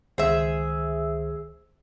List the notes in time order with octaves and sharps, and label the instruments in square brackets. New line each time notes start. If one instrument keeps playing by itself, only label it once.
[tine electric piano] C#2 D#3 C5 [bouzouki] G#4 E5